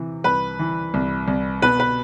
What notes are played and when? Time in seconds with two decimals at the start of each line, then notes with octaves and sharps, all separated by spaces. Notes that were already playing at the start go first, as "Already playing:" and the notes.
Already playing: C3 E3
0.24 C2 B4
0.59 E3
0.94 C2
1.28 C2
1.62 B2 B4
1.80 B4